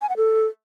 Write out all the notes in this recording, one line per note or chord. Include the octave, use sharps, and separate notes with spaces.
G#5
F#5
A4